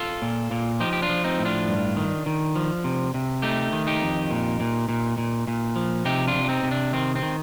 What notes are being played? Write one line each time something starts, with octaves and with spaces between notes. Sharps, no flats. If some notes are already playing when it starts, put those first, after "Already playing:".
Already playing: F4 A4
A#2
A#2
F3 D#4 G4
G4
D4 F4
F3
C4 D#4
A2
D4 F4
G2
D#3
D#3
F3
C3
C3
A3 D#4 G4
D#3
D#4 G4
F2
A#2
A#2
A#2
A#2
A#2
F3
C3 D#4 G4
D4 F4
C3
D4
C4 D#4
C3
D4
D#3 C4
C4
D#3